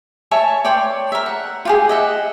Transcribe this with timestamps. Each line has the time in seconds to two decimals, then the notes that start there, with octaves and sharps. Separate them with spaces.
0.31 C#5 E5 G#5 A5
0.65 C#5 D5 G5 C6
1.12 A#4 E5
1.26 F#5
1.65 F4 G4 G#4
1.89 D#5 E5 F#5